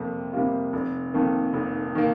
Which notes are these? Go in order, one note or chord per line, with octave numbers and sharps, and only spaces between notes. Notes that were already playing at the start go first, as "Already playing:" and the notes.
Already playing: F2 C3 G3 A#3
C3 G3 A#3 F4
F1
F2 D#3 A#3
F1
D#3 A#3